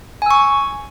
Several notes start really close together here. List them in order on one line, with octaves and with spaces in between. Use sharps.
G#5 E6 C#6